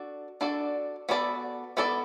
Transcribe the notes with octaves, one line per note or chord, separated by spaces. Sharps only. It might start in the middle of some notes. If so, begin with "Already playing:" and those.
Already playing: D4 F#4 A4 D5
D4 F#4 A4 D5
B3 F#4 A4 D5
B3 F#4 A4 D5